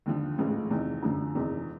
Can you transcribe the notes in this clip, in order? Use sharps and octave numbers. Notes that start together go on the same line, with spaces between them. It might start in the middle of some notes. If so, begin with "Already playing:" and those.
D#2 D3 F3
A1 G#2 F3 A3 C#4
E2 C3 D#3
F#2 D3 F3
E1 E2 C3 D#3